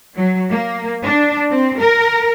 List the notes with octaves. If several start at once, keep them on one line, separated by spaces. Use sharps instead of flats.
F#3
A#3
D4
C4
A#4